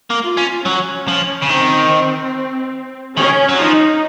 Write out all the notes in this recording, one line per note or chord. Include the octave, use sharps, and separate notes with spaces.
A#3
F4
C#4
F#3 C#4
F3
C#3
D#3 C4
D#3 C#4
F#3
F3 D#4